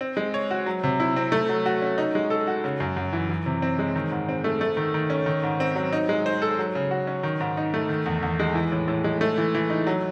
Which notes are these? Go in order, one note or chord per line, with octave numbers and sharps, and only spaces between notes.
C4
G#3
C#5
F#4
F#3
C3
E4
C4
A3
F#3
F#4
C#4
D#4
G#3
A4
F#4
C#3
F#2
F#2
E3
E3
C3
C4
G#3
D#3
G#2
C4
A3
A3
D#3
D#3
C#4
D#3
G#2
C4
F#3
D#4
G#3
C5
A4
F#3
C#3
F#4
C#4
D#3
G#2
D#4
A3
D#3
E2
E2
G#3
E3
A2
A2
G#3
A3
E3
E3
D#4
F#3